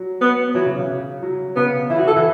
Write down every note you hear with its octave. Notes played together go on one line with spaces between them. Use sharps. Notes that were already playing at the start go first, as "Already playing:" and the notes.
Already playing: F#3
B3
E3 F#3
C#3
C#3
F#3
C#3 B3
E3 E4
F#4
A4
E3